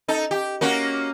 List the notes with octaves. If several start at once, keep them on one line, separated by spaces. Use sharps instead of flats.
D#4 A4
G4
A#3 C#4 F#4